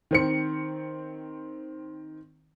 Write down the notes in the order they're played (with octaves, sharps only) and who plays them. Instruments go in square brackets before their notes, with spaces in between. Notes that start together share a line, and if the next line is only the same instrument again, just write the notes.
[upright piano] D#3 C4 C#7